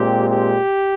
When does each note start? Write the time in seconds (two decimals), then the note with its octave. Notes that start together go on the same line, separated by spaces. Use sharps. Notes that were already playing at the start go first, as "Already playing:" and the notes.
Already playing: A#2 G#3 C4 G4
0.30 G4